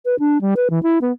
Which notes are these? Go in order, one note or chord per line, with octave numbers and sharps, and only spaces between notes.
B4
D4
G3
B4
E3
E4
B3